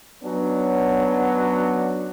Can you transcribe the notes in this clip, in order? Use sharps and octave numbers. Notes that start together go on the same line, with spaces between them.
F#3 B3 C#4 D4